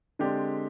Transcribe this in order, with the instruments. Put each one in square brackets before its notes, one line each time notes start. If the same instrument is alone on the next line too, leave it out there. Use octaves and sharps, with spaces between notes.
[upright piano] D3 G#3 C4 G4 D5